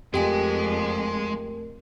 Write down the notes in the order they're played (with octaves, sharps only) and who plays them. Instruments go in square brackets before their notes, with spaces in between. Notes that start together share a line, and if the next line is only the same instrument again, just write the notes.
[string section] F2 [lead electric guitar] G#3 [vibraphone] A3 A#4 [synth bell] G4 G5 G#5